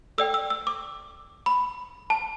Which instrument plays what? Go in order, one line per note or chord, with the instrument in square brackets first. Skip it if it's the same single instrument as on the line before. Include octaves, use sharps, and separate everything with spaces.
[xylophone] A4 D5 G5 E6
E6
E6
D6
B5
A5